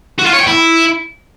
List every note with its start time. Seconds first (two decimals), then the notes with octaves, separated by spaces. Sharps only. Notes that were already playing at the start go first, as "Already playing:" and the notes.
0.19 F#4
0.26 F4
0.33 C#5
0.40 G5
0.47 E4